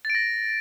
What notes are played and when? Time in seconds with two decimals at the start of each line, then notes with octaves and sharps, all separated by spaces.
0.05 A6
0.10 D7
0.15 A#6